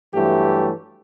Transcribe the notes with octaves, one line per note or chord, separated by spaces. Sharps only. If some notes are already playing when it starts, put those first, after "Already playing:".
G2 E3 F#3 A3 G4